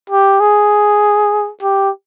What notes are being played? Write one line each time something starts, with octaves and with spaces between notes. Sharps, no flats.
G4
G#4
G4